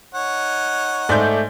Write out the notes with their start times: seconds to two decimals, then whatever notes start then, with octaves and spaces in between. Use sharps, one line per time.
0.15 D#4 C#5 F#5
1.09 G#2 A3 D5 G6